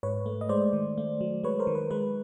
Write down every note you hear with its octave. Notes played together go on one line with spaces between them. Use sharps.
G#2 B4 C#5
A3
D#5
G#3 C5 D5
D#3
A3
F#3
G#3 B4 C#5
A#4 C5
D#3
B4
G#3 B4